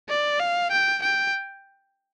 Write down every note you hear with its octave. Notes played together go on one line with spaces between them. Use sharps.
D5
F5
G5
G5